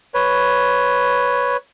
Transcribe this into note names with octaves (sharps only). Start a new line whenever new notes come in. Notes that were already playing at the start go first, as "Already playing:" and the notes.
B4 C#5